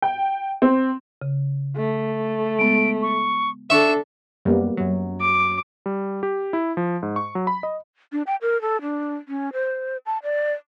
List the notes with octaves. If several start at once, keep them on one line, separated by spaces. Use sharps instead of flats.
G5
C4
C#3
A3
G#3 B3 D7
C#6
D4 A4 E5 C#6 E7
F#2 G3 A#3 B3
F#2 F#3
D6
G3
G4
E4
F3
G#2
C#6
F#3
B5
D#5
D4
G5
A#4
A4
D4
C#4
C5
A5
D5